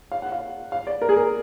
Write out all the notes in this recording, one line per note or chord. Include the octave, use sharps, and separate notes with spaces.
F5
F#5
F5
F5
D5
A#4
G#4
A#4